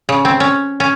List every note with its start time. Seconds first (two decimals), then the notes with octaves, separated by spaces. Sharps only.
0.09 C#3
0.25 C4
0.40 C#4
0.80 C#4